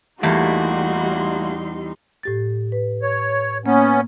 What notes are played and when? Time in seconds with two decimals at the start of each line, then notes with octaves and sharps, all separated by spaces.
0.23 E2 G3 A3 A#3 D#4 F#4 C6
2.23 A2 G4 A6
2.72 B4
3.02 C#5
3.66 A#3 B3 C#4